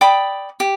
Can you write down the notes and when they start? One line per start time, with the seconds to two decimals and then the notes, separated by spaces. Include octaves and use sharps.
0.01 D5 G5 B5 D#6
0.60 G4